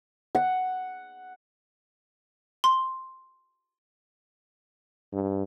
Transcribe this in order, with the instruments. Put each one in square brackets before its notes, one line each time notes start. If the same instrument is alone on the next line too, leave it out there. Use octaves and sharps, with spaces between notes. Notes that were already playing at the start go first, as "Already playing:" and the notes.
[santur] F#5
[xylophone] C6
[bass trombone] G2